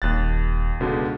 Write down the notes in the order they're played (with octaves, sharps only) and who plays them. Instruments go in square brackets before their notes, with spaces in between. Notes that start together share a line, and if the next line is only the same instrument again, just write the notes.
[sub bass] D#1 [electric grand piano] D#2 F#6 A6
[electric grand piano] C#2 B2 D3